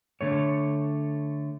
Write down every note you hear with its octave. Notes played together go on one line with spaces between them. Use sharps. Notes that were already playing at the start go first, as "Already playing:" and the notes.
D3 A3 C#5